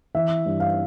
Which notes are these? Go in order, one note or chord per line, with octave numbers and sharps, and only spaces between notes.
E3 E5
G2
F5